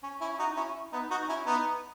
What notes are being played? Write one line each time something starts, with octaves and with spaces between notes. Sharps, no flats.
C#4
C#4 E4
D#4 F#4
C#4 E4
B3 D#4
D#4 F#4
C#4 E4
B3 D#4